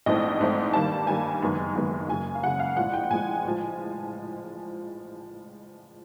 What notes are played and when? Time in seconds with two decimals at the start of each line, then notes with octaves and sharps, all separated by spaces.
0.06 A#1 G#2 E3 A3 C4 D#5
0.40 A#1 G#2 E3 A3 C4
0.73 G2 D#3 G3 A#3 A5
1.07 G2 D#3 G3 A#3 G#5
1.42 F#1 F#2 D#3 G#3 B3
1.75 F#1 F#2 D#3 G#3 B3
2.09 F#1 F#2 C#3 G#5
2.35 F5
2.43 F#1 F#2 C#3 F#5
2.60 F5
2.76 A#1 A2 F3 G#3 F#5
2.93 G5
3.04 G5
3.10 A#1 A2 F3 G#3 G#5
3.45 A1 A2 F3 G#3